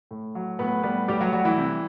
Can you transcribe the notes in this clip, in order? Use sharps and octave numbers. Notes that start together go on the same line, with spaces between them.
A2
F#3
A2 B3 B4
G3 B3 B4
A2 G3 G4
F#3 F#4
F#3 G3 F#4
E3 E4
C3